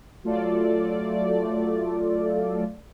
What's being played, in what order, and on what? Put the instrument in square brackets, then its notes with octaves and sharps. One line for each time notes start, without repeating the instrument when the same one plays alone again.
[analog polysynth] F#3 A3 F4 A4 D5